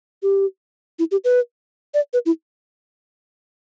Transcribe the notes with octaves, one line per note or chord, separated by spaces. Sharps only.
G4
E4
G4
B4
D5
B4
E4